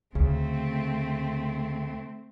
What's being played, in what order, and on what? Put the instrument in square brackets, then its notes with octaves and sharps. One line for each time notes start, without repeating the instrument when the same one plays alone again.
[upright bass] D2 [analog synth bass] C#3 [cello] A3 C4